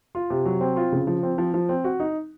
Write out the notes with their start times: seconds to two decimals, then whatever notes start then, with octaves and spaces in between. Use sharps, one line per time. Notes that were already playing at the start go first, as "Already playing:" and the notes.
0.15 F4
0.30 C3
0.45 F#3
0.61 C4
0.76 F4
0.92 C#3
1.07 F3
1.23 C4
1.38 F3
1.54 F3
1.69 C4
1.84 F#4
2.00 D#4